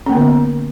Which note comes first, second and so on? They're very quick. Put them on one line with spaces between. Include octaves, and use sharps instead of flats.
C#4 A#3 B3 D3